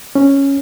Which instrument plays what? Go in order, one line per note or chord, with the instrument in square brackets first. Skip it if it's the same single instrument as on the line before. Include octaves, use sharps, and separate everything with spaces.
[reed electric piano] C#4